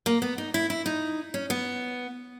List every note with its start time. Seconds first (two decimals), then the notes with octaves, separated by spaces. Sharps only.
0.06 A#3
0.22 B3
0.38 D#4
0.54 E4
0.70 E4
0.86 D#4
1.34 C#4
1.50 B3